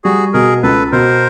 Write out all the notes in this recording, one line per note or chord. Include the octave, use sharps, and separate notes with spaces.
G3 F#4 G#4
B2 G#4 A#4
C#2 A4 B4
B2 A#4 C5